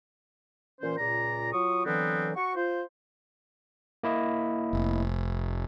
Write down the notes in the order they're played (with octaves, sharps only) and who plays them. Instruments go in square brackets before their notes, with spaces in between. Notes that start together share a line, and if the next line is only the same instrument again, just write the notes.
[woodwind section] A#2 E3 C#4 C5
C#2 A#2 D5 A#5
F#3 F4 C#6 D#6
D3 E3 F#3 B3 C4
F#4 C#6
F4 C5
[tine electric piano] A#3 E4 D#5
[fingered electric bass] F1